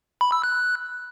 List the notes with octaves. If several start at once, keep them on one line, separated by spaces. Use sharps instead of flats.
B5
E6
F#6